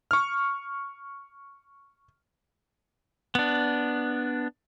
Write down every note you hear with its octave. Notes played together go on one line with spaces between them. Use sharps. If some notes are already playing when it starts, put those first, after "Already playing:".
C#6 F6
B3 D4